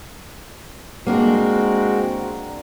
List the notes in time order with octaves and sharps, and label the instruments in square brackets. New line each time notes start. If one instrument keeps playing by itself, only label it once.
[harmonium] G#3 C4 F#4 [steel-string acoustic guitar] A#3 D4 A#4